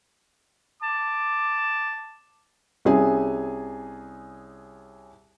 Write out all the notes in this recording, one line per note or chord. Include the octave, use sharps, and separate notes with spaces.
A5 D6
C2 C#4 G#4 G#5